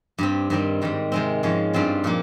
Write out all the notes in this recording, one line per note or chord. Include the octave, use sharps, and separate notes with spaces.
G2 G3 C4
G2 D#3 G3 C4
G#2 D#3 G3
C3 D#3 G#3 C4
G#2 F3 G#3 C#4
G2 G3 C4 F4
A#2 F3 A#3